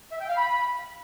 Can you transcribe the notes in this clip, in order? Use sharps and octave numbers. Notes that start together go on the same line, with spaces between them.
E5
G5
F5
B5